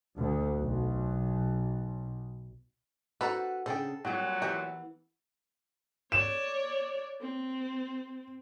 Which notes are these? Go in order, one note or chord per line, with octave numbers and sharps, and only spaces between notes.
D2
B1
D4 F#4 A4 B4 C5 A#5
C#3 D4 G#4 A4 C5 G5
A#2 F#3 G3 C4 F4 G4 G5
E3 B3 G4 A#4 E5
C#5 D5 E7
C4